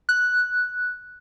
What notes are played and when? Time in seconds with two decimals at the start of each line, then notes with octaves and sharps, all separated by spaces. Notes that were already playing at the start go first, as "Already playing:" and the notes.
0.09 F#6